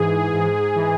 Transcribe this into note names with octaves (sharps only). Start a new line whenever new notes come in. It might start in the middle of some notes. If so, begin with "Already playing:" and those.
Already playing: G#2 E3 G#4
G#2
E3